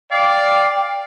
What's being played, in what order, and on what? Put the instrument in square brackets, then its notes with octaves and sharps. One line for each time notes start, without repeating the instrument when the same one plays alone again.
[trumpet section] D5 [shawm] F5 [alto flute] G5